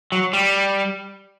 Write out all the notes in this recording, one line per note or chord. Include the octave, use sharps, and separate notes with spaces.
F#3
G3